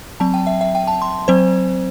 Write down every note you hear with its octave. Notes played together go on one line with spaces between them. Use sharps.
F#3 C4 A5
G5
E5
E5
G5
A5
C6
F#3 C4 C5